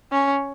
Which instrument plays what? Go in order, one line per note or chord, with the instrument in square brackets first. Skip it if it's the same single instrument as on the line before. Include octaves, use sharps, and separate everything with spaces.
[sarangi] C#4